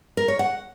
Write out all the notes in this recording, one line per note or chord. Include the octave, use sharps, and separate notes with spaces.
A#4
C#5
F#5